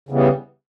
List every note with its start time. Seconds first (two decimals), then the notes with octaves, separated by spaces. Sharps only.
0.09 C#3 E3 G3 B3